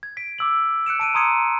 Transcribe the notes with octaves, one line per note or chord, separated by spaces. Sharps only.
G#6
B6 D7
D6 E6 F#7
F#6 C#7 D7 E7
A5 D7 D#7
A#5 C6 D#6 G#6 C#7 D#7